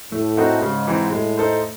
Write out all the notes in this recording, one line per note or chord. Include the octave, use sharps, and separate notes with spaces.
A2 A3
C4 D#4 F#4 A4
G#2 C#3
E3 C4 D#4
A2 G#3
D#4 A4 C5